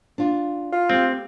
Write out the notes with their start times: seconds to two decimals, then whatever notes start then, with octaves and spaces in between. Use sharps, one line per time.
0.18 D4 F4
0.72 F4
0.89 A3 C4 G4